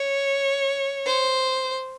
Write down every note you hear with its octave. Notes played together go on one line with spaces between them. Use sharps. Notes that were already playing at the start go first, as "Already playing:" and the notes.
Already playing: C#5
C5